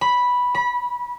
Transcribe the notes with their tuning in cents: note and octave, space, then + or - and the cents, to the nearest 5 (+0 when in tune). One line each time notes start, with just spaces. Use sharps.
B5 -5
B5 -25